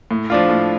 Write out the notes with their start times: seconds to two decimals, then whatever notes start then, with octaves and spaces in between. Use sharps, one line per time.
0.11 A2
0.30 F3 D4 F4
0.49 A2